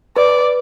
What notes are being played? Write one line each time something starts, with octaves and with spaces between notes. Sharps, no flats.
B4 D5